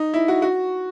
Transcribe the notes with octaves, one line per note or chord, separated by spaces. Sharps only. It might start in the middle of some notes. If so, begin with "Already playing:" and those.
Already playing: D#4
E4
F#4
F#4